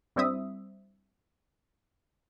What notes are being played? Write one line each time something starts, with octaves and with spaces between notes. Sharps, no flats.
G2 G3 C4 E4 E5 D#6